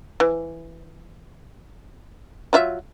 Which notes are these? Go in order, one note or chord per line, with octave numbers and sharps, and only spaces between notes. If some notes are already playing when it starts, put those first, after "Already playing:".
E3
F#3 F4 E5